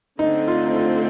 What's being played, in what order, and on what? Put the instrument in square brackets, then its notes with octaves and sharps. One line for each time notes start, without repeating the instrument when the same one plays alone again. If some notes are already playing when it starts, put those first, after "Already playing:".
[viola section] D3 A3 C4 [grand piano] D#4
[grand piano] F4
D#4
F4